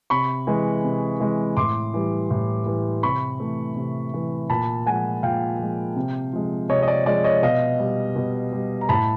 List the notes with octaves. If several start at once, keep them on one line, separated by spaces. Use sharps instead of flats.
C3 B5 C#6
E3 G#3
C3
E3 G#3
A2 C6 D6
E3 G3
A2
E3 G3
C3 B5 C#6
E3 A3
C3
E3 A3
A#2 A5 B5
F3 G#3 F#5 G#5
A#2 F5 G5
F3 G#3
C3
F3 G#3
C3 C#5 D#5
D#5
D5
F3 G#3 D5
C#5 D#5
B2 D#5 F5
G3
B2
G3
A#5
A2 A5 B5